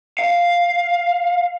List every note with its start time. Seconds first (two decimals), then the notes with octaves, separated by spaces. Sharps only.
0.19 F5